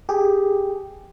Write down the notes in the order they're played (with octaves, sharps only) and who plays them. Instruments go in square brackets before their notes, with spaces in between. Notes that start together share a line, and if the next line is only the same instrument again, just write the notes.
[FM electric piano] G4 G#4